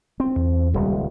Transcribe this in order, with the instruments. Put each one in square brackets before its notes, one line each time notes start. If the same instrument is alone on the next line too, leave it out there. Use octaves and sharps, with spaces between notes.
[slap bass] C4
[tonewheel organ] E2
[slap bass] D#1 C#2 [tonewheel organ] G3